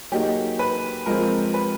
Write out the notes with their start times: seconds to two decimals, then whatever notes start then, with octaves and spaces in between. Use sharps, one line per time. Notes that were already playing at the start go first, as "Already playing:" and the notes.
0.12 F#3 A#3 D#4 G4 G#4
0.59 B4
1.06 F3 G#3 C4 A#4
1.54 B4